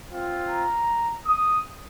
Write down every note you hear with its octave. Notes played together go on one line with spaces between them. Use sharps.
C4 F4
A#5
D#6